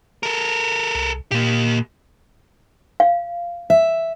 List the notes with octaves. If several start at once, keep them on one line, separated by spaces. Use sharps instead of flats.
A4 A#4
C2
A#2 A#3 G4
F5
E5